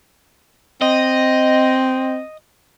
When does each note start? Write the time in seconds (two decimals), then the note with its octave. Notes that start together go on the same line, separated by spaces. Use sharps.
0.82 C4 D#5